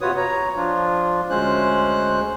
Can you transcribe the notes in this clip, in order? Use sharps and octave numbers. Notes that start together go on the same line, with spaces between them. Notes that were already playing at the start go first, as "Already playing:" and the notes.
C3 F4 F#4 B4 C#5 D#6
C#5 A#5
F3 D4 F4
D2 G#3 C#4 C5 F#6